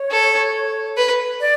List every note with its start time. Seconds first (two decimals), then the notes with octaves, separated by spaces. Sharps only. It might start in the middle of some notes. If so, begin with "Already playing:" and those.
Already playing: C#5
0.12 A4
0.97 B4
1.39 D5